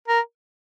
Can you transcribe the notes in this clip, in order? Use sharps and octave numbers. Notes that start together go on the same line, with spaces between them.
A#4